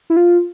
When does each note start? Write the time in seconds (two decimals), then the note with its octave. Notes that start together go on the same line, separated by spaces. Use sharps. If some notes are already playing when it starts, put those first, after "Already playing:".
0.10 E4
0.17 F4